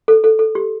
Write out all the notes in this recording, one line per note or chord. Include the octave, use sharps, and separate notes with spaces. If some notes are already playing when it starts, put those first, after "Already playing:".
A4
A4
A4
G4